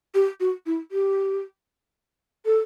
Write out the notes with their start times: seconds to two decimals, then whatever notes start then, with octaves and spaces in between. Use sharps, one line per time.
0.14 G4
0.40 F#4
0.66 E4
0.92 G4
2.45 A4